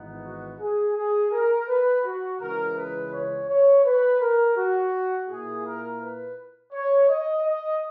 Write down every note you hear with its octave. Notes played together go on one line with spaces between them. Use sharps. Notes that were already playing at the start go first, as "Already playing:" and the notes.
Already playing: G#1 G#2 E3 B3 D#4
F#4
G#4
G#4
A#4
B4
F#4
C#2 C#3 E3 G#3 A#4
B4
C#5
C#5
B4
A#4
F#4
A#2 A#3 E4 G#4
A#4
B4
C#5
D#5
D#5